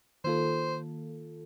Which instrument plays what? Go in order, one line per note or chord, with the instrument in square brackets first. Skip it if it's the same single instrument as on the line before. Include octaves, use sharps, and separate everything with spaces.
[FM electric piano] D#3 A#3 F4 A4 [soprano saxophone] C5